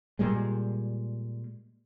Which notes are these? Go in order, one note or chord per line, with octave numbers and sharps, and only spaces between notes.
A#2 G3 G#3